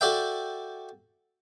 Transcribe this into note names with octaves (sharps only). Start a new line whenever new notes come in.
F#4 A4 D5 E5 G5